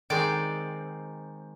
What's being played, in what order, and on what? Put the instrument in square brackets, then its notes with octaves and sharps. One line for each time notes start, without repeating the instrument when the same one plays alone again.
[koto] D#3 G#3 C4 D5